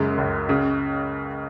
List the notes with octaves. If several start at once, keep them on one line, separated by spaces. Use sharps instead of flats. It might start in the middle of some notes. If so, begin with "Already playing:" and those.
Already playing: F#2 C#3 G#3
C#2
C#3